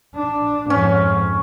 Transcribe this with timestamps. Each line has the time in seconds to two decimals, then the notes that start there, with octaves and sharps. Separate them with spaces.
0.15 D4
0.70 F2 G#2 C#4